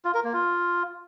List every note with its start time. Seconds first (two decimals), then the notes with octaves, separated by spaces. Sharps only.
0.05 F4
0.14 A#4
0.24 A#3
0.33 F4